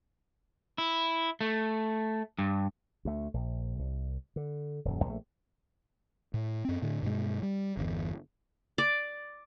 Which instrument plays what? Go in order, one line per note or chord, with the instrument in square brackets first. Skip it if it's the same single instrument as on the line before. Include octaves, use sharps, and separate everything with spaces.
[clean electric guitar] E4
A3
G2
[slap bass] D2 A3
A#1
C2
D3
D#1 F#2
A#1 D#3 A3
[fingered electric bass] A2
F#2 C4
A2 D3
G2 B2 G#3
G3
G1 E2
[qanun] D5